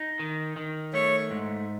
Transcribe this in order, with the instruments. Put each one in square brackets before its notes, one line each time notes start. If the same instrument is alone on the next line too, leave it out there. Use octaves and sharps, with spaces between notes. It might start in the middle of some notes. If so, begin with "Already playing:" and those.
Already playing: [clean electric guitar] D#4
D#3
D#3
[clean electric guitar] A3 [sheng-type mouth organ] C#5
[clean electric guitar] G#2